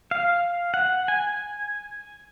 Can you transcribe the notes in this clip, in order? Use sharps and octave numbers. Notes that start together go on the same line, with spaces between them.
F5
F#5
G#5